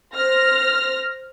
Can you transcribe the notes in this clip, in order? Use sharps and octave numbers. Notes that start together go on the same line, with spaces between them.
C5 F6 A#6